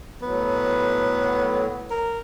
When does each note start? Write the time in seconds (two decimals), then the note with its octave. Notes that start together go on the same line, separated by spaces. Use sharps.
0.22 A2 F#3 B3
1.91 A#4